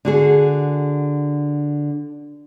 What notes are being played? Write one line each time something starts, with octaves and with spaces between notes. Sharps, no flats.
D3 F#4 G#4